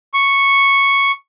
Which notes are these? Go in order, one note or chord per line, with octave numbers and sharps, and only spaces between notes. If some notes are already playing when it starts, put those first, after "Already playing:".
C#6